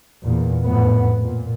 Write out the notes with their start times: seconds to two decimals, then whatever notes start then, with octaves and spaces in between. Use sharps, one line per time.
0.23 E2 A#2
0.63 F2 A2 B3
1.21 A#2